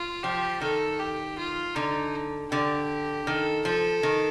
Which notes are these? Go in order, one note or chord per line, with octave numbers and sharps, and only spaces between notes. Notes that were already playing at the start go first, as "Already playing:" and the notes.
Already playing: F4
F3 G4
D#3 A4
G4
F4
D3 D#4
D3 G4
D#3 A4
F3 A4
D#3